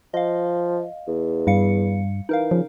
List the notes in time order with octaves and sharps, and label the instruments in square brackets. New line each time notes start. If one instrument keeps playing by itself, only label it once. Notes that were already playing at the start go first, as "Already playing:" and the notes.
[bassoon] F3 [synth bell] D#5 F5
[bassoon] E2
[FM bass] G2 [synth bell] G3 F5 C#7
[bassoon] E3 [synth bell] D#4 A#4 F5
[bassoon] C#3 [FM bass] F3